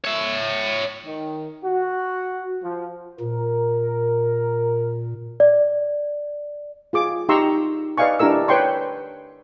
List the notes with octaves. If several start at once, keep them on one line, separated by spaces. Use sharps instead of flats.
C#5 E5
D#3
F#4
F3
A#2 A#4
D5
F4 G#4 D6
D#4 G4 A#5 C6 C#6 E6
B4 D5 D#5 F5 G#5 C#6
D4 E4 G4 A#4 E6
B4 C#5 G5 C6 C#6